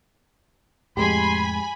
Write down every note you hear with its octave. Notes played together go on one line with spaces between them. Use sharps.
F2 A2 G#3 G4 G#5 B5 C6